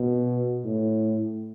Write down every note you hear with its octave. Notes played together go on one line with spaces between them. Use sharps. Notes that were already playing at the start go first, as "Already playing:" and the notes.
Already playing: B2
A2